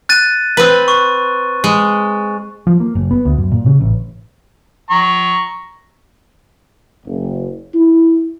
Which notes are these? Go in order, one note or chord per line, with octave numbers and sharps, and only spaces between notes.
F#6 A6 D#7
C4 B4
C#6
G#3
F3
A#3
F#1
B3
D2
F#2
A#2
C#3
A1
A#5 C#6
F#1
E4